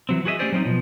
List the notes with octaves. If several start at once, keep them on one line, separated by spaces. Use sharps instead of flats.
E3 F#3 C4
F#4 G#4 B4 D#5 E5
A3 C#4 G4 G#4 C5 D5
F#3 G3 C4 C#4 D#4
B2 F3